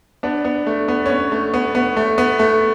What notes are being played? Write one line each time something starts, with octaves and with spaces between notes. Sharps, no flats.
B3 D4
B3
A3
B3
C#4
B3
A3
B3
B3
A3
B3
A3